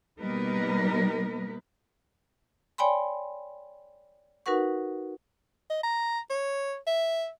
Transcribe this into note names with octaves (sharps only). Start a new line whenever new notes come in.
B2 G3 A#3 D#4 A#4 B4
C#5 D5 G5 G#5 B5 C6
D#4 F#4 A#4 B4 F#5 C#6
D#5
A#5
C#5
E5